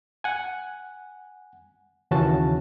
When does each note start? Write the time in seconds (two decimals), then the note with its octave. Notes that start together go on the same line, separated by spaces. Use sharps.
0.24 F#5 G#5
2.11 D#2 C#3 E3 C#4 F#4 A5